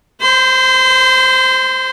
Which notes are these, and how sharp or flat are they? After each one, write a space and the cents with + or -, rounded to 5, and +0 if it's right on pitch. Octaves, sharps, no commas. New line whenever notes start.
C5 +0 C6 -30